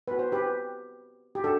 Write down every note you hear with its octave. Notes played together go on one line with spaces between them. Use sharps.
B3 F#4 B4
C5
G4 B4
G4
D4 F#4 A4